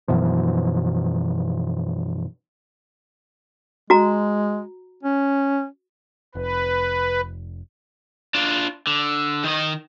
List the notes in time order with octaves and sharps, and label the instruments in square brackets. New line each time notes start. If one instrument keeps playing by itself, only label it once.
[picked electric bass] F#2 B2 E3 F3
[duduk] G#3 [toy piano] F#4 A#5
[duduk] C#4
[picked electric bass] F1 [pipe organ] B4
[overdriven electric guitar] D4 F4
D3
D#3 D#5